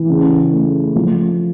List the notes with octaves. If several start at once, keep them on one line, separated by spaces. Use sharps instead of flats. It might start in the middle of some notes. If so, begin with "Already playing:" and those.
Already playing: E3
C#3
A3
F3